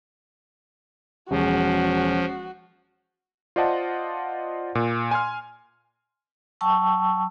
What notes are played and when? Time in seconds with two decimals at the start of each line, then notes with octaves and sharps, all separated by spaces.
1.31 E1 F3 C#4 F#4 G#4
3.56 F4 C5 D5 D#5 F#5 A5
4.75 A#2
5.11 G#5 C6 F6
6.61 F#3 G5 A5 C#6 E6